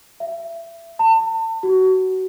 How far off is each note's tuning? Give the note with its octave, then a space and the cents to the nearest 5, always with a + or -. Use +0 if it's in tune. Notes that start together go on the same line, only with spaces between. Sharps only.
E5 +25
A5 +35
F#4 +25